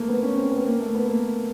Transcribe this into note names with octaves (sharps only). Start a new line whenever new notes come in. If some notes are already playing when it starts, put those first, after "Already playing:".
Already playing: A3 A#3
B3
C#4
C4
B3
A#3
A3
B3
A#3